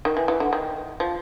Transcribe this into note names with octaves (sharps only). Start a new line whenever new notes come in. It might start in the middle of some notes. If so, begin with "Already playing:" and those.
D#3
E3
E3
D3
D#3
F3